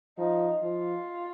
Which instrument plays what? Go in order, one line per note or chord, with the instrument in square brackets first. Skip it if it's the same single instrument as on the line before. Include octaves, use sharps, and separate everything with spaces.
[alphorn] F3 [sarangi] D#4
[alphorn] F3 [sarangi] F4